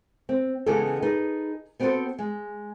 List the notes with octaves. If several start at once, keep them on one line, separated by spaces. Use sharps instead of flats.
C4
C#3 E3 G#3 B3 G4 A4
D#4 G#4 A4 B4
B3 C4 F#4 G#4 A4 C5
G#3